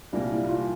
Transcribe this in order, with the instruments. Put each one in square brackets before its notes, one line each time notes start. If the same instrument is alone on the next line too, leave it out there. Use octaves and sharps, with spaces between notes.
[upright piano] C2 A#2 G3 A#3 [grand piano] D4
[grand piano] E4
F4